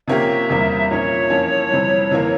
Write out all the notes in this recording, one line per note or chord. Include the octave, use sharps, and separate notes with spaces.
C3 F3 A#3 C#4 G4 E5
E2 C3 G3 A#3
A#2 F3 A#3 C#4 C#5
F2 E3 A#3 C#4
F2 C3 E3 G3
C3 E3 A#3